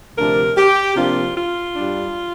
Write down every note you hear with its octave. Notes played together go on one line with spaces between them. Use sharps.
D2 C3 F3 D4 A#4
G4
C3 F3 A#3 D4 F4
F4
G2 G3 D4